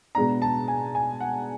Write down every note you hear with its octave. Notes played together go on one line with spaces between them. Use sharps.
B2 G#3 B3 D4 A#5
A5
G#5
G#5
F#5